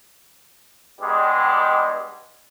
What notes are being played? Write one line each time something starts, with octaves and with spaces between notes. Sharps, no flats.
G2 B2 G3 G#3